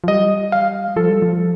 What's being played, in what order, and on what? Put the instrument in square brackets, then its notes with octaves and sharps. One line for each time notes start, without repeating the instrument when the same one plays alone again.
[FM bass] F3
[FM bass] G3 [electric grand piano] D#5
[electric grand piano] F5
[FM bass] F3 [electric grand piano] A4
[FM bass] G3
F3